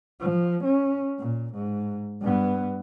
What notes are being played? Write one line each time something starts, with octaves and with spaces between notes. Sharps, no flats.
F3
C#4
A#2
G#2
G2 B3